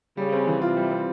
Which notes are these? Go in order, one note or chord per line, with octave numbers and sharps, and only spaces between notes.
C#3 G3
C4
E3
C3 F4
G3
C4